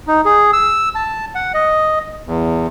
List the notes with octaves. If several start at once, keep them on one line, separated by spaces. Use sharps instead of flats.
D#4
G#4
E6
A5
F#5
D#5
E2